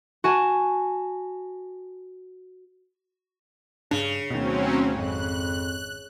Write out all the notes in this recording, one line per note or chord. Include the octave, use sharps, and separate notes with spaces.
F#4 G#5 A5
G2 C#3 D4
D2 B2 D#3 F#3 C4 C#4
G#1 F2 F#6